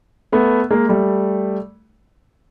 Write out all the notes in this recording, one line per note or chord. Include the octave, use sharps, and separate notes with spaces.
A3 B3
G#3 A#3
G3 A3